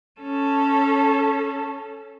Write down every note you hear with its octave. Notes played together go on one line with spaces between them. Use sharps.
C#4 A4